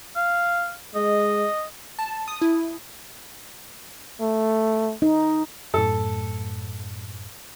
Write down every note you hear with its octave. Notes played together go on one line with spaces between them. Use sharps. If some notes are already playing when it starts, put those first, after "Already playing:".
F5
G#3 D#5
A5
D#6
E4
A3
D#4
F#2 A2 A4